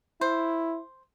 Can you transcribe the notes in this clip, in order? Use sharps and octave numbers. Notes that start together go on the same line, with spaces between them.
E4 C5